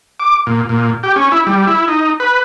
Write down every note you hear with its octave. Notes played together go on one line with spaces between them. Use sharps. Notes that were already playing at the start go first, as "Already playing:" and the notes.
D6
A#2
A#2
G4
C#4
E4
G3
E4
D#4
B4